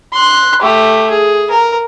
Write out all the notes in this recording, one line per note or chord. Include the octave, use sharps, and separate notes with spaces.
C6 F#6
A3 G4
G#4
A#4